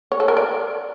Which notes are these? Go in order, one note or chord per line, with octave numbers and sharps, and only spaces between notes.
C#5
A4
A#4
D5